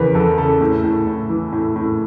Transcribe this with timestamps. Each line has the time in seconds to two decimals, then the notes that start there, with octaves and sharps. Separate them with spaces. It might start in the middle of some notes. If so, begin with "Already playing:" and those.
Already playing: E2 C#3 A#4 B4
0.15 E2 A4
0.37 C#3 A4
0.60 A2
0.84 A2
1.07 A2
1.29 E3
1.52 A2
1.76 A2